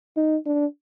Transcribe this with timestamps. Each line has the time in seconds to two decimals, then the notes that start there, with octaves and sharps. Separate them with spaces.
0.17 D#4
0.46 D4